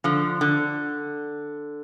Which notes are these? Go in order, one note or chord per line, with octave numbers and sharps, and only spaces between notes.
D3 F3
D3